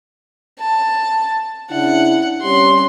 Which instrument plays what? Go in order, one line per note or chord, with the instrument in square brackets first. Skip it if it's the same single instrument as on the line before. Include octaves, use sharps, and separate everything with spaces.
[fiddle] A5
[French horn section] C#3 D4 E4 [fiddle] F#5
[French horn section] G3 C4 G4 [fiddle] C#4 C6